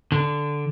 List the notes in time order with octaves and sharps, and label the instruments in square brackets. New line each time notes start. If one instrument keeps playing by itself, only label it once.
[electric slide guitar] D3